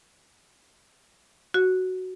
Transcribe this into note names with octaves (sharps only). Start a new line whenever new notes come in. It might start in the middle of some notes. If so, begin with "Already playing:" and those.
F#4